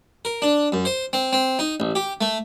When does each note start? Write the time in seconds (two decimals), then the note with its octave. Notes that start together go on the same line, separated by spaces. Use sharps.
0.25 A#4
0.42 D4
0.72 F#2
0.85 C5
1.13 C4
1.33 C4
1.59 D#4
1.80 A1
1.95 G4
2.21 A3